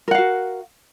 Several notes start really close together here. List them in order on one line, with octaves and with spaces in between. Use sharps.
A#4 F#5 F5 F#4